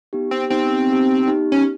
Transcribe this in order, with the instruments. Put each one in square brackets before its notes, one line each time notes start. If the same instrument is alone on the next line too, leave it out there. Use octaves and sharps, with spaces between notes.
[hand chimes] B3 D#4 G4
[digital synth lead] C4
[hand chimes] B3 D#4 G4 [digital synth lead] C4
[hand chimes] B3 D#4 G4
B3 D#4 G4
[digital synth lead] C#4